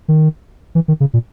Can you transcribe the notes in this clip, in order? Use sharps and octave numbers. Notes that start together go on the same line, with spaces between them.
D#3
E3
D#3
C#3
A#2